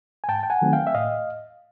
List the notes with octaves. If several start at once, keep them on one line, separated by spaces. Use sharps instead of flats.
G#5
G#2 G5 A5
G5
F#5 G#5
D#3 F#3 A3 C4
F5 G5
E5
A2 D#5 F5